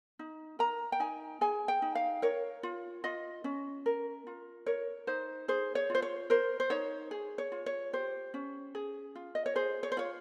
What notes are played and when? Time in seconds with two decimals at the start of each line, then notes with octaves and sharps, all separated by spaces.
0.19 D#4
0.59 A#4 A#5
0.92 G5
1.00 D#4 G#5
1.41 G#4 G#5
1.68 G5
1.82 D#4
1.95 F5
2.22 A#4 C#5
2.63 F4
3.04 F4 D#5
3.44 C#4
3.86 A#4
4.27 F4
4.66 A#4 C#5
5.07 D#4 C5
5.48 G#4 C5
5.75 C#5
5.90 F4 C5
6.02 C#5
6.30 A#4 C5
6.60 C5
6.70 D#4 C#5
7.11 G#4
7.38 C#5
7.52 F4
7.66 C#5
7.93 G4 C5
8.34 C#4
8.75 G#4
9.15 F4
9.35 D#5
9.46 C#5
9.56 G#4 C5
9.83 C#5
9.92 C5
9.97 F4 C#5